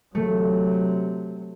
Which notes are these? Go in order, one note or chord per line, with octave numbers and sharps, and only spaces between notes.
C3 F#3 A3